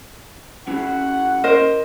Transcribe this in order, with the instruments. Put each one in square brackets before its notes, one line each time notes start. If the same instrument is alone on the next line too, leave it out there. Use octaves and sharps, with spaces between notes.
[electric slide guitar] C#4 E4 F#4 [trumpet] F#5
[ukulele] A#4 C5 D#5